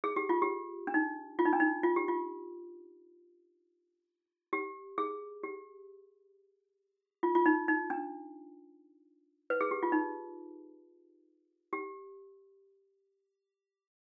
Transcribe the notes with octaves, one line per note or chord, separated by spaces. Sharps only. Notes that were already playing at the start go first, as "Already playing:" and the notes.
G#4
G4
F4
G4
D4
D#4
F4
D#4
D4
D#4
F4
G4
F4
G4
G#4
G4
F4
F4
D#4
D#4
D4
B4
G#4
G4
F4
D#4
G4